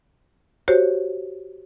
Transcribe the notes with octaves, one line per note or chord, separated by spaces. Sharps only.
F#4 G4 C5 C#5